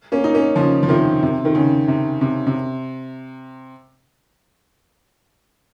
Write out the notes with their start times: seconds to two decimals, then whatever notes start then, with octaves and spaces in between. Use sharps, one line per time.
0.12 A#3 C#4
0.24 D#4
0.34 A#3 C#4
0.56 C#3 F3
0.83 F3
0.89 C3 D#3
1.23 C3
1.45 D#3
1.55 C#3
1.88 C3
2.21 C3
2.47 C3